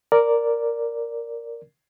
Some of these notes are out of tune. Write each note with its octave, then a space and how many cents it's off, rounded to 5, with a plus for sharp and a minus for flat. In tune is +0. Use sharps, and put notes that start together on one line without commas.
A#4 +0 D5 -5